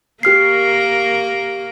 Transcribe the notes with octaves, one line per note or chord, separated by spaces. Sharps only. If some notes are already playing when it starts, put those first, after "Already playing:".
A#3 G4 A#4 F6 C7